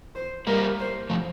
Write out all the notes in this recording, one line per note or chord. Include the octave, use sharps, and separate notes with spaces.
C5
G3 A#3 A#4
C5
F3 A3